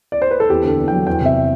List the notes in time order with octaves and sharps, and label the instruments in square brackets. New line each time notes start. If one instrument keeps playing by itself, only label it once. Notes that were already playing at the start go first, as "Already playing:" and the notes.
[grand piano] D5
C5
B4
A4
E2 G4
D3 A4
E2
G5
F#3
E2 G5
C3 E5